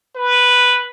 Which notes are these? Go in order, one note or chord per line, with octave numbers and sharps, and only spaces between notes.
B4